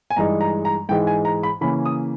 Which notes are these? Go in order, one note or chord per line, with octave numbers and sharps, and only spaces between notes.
G#5
G2 E3 G#3 D#4 A#5
A#5
A#5
G#2 E3 G#3 D#4 G5
G#5
A#5
B5
C#3 E3 A#3 C#4 B5
D#6